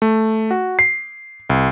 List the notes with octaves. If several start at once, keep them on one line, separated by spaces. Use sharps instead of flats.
A3
F#4
C7
C2